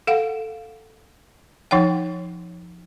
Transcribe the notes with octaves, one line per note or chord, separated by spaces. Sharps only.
A4 F5 F#5
F3 D#4 C#5 F#5 G5